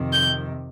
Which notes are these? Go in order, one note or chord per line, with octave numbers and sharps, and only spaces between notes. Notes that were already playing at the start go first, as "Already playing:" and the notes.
Already playing: F2 C3 D#3
G6